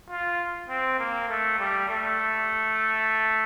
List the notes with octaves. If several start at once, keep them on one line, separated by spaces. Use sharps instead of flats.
F4
C4
A#3
A3
G3
A3